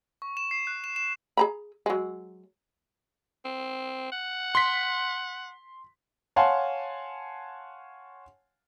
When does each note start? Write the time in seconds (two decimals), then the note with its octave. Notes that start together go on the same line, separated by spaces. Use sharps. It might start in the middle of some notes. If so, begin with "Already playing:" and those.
0.22 C#6
0.37 E7
0.51 C7
0.67 F#6
0.84 E7
0.96 E7
1.37 G#4 A#5 B5
1.86 F#3 G#3
3.45 C4
4.12 F#5
4.55 C6 B6
6.36 C#5 F5 F#5 G#5 A5 C6